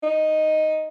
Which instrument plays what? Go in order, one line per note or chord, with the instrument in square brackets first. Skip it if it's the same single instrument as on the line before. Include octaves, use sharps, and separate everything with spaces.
[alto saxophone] D#4